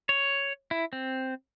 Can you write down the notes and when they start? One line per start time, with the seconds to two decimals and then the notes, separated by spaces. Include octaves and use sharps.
0.09 C#5
0.71 E4
0.93 C4